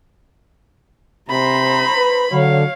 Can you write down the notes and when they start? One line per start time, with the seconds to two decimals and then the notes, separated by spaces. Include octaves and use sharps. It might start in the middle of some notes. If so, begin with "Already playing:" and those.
1.30 C3 C5 A#5 B5
1.96 B4
2.32 D3 F#3 C#5 F5